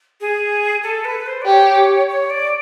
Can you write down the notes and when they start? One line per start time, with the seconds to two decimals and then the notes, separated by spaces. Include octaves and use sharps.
0.21 G#4
0.83 A4
1.05 B4
1.26 C5
1.42 D5
1.46 G4 C#5
2.09 C#5
2.30 D5